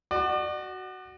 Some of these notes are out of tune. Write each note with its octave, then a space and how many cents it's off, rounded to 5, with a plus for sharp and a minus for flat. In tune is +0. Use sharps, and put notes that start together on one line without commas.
F#4 +10 D5 +40